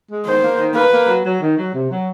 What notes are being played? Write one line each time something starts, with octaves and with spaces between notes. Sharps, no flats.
G#3
D#3 C5
A#3
D#3
A#3 B4
A#3
F#3
F#3
D#3
F#3
C3
F#3